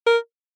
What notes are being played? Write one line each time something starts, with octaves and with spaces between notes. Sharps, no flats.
A#4